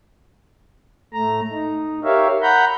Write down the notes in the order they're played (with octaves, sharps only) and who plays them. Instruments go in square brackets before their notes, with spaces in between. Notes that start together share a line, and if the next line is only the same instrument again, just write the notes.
[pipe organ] A2 A3 A#5
D#4
G4 A#4 C#5 E5 F5
F#5 A#5 B5 G6